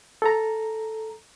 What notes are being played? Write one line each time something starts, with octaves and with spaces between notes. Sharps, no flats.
A4 A#5